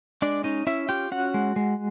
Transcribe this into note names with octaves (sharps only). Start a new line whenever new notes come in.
G#3 D4 D5
C#4 D#4 D#5
C#4 E4 E5
F4 G4 G5
C#4 F#4 F#5
G#3
G#3